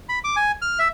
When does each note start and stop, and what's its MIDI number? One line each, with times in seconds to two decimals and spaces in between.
0.09 0.19 83
0.24 0.36 86
0.36 0.52 80
0.62 0.79 89
0.79 0.88 76